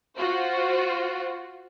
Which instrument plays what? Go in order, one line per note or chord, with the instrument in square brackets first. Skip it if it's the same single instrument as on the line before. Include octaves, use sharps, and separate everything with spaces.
[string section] F4 F#4 C5